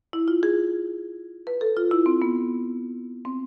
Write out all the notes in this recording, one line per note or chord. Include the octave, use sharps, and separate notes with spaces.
E4
F4
G#4
B4
A4
F4
E4
C4
B3
C4